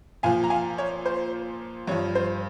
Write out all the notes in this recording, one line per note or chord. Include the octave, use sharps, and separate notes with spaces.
A#2 F3 F5 G#5
A#5
F5 G#5
C#5
C5
G2 F3 C#5
C5